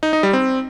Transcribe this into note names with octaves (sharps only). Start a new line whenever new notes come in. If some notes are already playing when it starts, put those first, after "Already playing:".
D#4
D#4
G3
C4